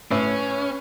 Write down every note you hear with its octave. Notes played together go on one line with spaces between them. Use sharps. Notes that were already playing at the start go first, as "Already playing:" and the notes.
A2 C#4 B4